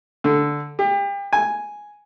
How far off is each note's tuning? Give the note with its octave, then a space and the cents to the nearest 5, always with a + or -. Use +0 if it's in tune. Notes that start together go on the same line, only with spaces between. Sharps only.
D3 -5
G4 +35
G#5 +0